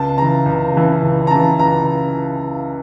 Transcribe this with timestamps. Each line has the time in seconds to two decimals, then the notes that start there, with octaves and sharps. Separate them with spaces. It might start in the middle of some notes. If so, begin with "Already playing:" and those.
Already playing: C#2 A5
0.17 C#3 E3 A#5
0.46 C#2
0.74 C#3 E3
1.02 C#2
1.27 A#5
1.31 C#3 E3 A5
1.59 C#2 A#5